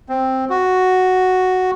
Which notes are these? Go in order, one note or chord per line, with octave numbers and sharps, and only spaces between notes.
C4
F#4